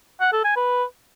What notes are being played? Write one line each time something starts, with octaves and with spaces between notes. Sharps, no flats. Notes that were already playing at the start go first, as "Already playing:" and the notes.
F#5
A4
G#5
B4